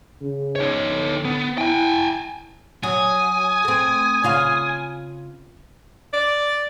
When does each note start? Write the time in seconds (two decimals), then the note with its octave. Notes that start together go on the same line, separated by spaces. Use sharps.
0.21 C#3
0.56 D#4 C#5
0.87 D3
1.25 B3
1.58 E4 G5 G#5
2.83 F#3 G#5 D#6
3.65 A3 C4
4.24 C#3 F4 F5
6.13 D5